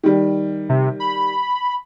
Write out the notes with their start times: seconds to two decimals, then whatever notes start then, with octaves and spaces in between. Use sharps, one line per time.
0.03 D#3 G3
0.69 C3
1.00 B5